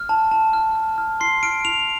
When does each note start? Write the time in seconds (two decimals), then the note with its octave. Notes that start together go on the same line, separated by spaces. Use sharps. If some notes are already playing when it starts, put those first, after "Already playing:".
Already playing: F6
0.09 A5
0.31 A5
0.53 F6
0.75 F6
0.98 F6
1.20 C6 C7
1.43 F6 D7
1.65 F6 F7